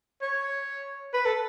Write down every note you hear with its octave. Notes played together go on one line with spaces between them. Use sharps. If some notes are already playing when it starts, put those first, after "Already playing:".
C#5
B4
A4